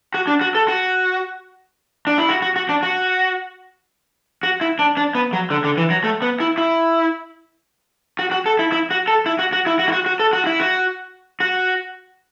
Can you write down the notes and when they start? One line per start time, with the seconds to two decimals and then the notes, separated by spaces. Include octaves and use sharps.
0.14 F#4
0.27 D4
0.41 F#4
0.55 A4
0.68 F#4
2.07 D4
2.18 E4
2.29 F#4
2.42 F#4
2.56 F#4
2.69 D4
2.83 F#4
4.43 F#4
4.61 E4
4.79 D4
4.97 D4
5.15 B3
5.33 F#3
5.50 D3
5.64 D3
5.77 E3
5.90 F#3
6.04 A3
6.22 B3
6.40 E4
6.58 E4
8.19 F#4
8.31 F#4
8.46 A4
8.59 E4
8.72 E4
8.91 F#4
9.08 A4
9.26 E4
9.39 F#4
9.53 F#4
9.66 E4
9.79 F#4
9.88 E4
9.93 F#4
10.06 F#4
10.19 A4
10.33 F#4
10.46 E4
10.60 F#4
11.40 F#4